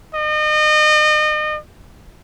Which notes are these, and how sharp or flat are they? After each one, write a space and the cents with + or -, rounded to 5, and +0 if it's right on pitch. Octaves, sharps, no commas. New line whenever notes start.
D#5 -35